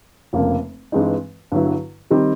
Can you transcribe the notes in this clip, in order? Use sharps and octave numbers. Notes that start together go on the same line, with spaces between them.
F1 F2 C#3 F3 A#3
G2 E3 G#3 C4 D#4
G2 D3 F#3 B3 E4
D#3 G3 C4 D#4 G4